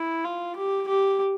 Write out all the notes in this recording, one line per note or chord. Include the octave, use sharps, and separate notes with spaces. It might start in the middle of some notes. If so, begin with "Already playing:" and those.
Already playing: E4
F4
G4
G4